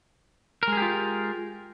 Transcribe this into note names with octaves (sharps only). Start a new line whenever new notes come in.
G#3 F4 G4 G#4 A#4